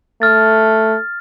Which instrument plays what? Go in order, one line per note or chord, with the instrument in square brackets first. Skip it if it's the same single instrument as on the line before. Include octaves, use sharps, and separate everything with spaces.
[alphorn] A3 [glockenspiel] F6 A6